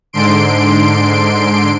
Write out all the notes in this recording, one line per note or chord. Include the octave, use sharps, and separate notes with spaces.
G#2 D3 C6 D7